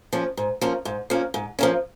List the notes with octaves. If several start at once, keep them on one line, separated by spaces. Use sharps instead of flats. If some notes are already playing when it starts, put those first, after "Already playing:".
F3 A#3 C#4
G#2
F3 A#3 C#4
G#2
F3 A#3 C#4
G#2
F3 A#3 C#4